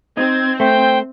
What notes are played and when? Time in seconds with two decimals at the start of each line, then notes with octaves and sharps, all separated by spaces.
0.17 C4 D#4 G#6
0.60 A3 C5 G5